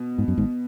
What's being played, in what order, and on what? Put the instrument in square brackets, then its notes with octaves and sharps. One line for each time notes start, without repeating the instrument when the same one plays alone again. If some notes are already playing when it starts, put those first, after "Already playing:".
Already playing: [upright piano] B2
[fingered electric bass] G#2
F#2
G#1 G#2